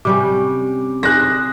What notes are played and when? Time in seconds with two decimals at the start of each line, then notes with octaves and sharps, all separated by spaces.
0.05 C3 G3 C#4 D6
1.03 G#4 C5 D5 F#6 A#6